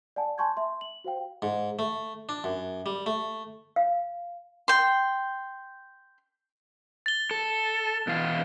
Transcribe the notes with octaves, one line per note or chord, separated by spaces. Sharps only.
D5 F#5 G#5 A5
G#5 A5 C6 C#6 G6 G#6
E5 C6
F#7
F#4 C5 F5 G5
G#2
A3
D4
F#2
G3
A3
F5
G5 C6
A6 G7
A4
B2 E3 F5